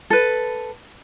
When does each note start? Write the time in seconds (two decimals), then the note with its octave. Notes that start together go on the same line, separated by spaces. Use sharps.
0.10 A4 B4